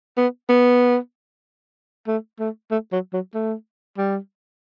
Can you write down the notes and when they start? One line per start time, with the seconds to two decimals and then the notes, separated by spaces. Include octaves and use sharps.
0.17 B3
0.49 B3
2.07 A3
2.39 A3
2.71 A3
2.92 F#3
3.13 F#3
3.34 A3
3.98 G3